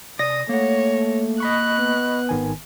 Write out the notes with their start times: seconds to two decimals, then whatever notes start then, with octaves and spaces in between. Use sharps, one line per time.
0.19 C3 D5 D#6 A#6
0.49 A3 A#3 C#5 F#5
1.40 D#5 B5 C#6 F#6
1.79 B3
2.29 G#1 D#3 G#5